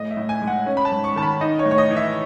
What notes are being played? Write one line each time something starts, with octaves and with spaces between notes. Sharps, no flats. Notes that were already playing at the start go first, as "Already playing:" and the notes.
Already playing: A2 D#5
E5
A2
G#5
G#3
F#5
C#4
B5
A5
G#2
C#6
D#3 A5
B5
D#4 D#5
C#5
A2
C#5
D#5
E3
E5